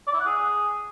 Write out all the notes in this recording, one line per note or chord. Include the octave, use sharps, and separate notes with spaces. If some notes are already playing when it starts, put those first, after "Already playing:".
D5
E4
F#5
G#4